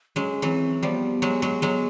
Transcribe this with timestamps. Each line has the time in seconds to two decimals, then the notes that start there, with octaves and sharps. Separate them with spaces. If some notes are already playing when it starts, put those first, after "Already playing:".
0.16 F#3 G#3 C#4
0.42 E3 F#3 C4
0.82 F3 G3 B3 C4
1.22 F#3 G#3
1.42 F#3 G#3
1.62 F#3 G#3